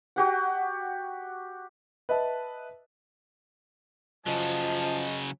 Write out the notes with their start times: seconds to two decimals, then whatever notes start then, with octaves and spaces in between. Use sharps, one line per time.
0.16 F#4 G4 F#5
2.09 B4 D#5 E5 A5
4.26 C#3 F3 F#3 D#5 A5